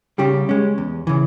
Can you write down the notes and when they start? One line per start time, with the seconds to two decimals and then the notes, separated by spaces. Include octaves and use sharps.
0.18 C#3 G3 G4
0.49 G#3 C#4
0.78 E2
1.07 C#3 E3